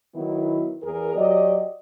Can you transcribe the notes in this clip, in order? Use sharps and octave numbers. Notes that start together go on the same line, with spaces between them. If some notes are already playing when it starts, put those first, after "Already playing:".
D#3 F#3 B3 E4
E2 G#4 A#4
F#3 G4 D5 D#5